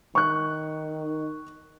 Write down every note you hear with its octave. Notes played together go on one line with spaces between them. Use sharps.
D#3 C#6 F#6